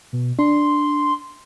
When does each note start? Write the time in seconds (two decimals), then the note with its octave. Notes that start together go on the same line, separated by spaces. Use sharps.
0.13 B2
0.39 D4 C6